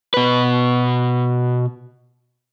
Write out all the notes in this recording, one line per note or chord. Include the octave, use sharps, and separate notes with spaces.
B2 B4